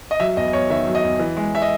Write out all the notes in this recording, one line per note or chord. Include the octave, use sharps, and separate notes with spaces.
D#5
F#3 E5
E2 D#5
E2 C#5
D#3 E5
F#3
D#5
E2
E3
G#3
E5
D#5